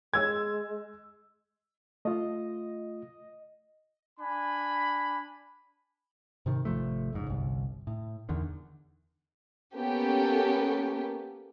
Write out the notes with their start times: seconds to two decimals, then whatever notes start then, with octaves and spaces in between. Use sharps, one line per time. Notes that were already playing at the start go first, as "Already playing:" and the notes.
0.14 G#3 E6 G#6
2.05 A3 F4 D#5
4.20 D4 G#5 B5
6.46 G#2 C3 D#3
6.65 G#1 C3 F3 A3
7.13 F1 C#2 G#2
7.27 G1 C2
7.87 A2
8.29 E2 D3 D#3
9.75 A#3 B3 C#4 G4 A4